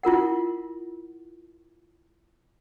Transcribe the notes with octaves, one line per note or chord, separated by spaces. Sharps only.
E4 F4 A#4 F#5